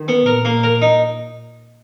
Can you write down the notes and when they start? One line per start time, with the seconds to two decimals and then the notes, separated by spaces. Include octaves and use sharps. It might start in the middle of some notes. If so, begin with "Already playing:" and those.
Already playing: D#3
0.08 B3
0.26 A#2 A#4
0.45 A#3
0.63 A#4
0.82 D#4